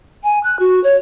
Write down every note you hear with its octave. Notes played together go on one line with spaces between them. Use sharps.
G#5
F#6
F#4
C#5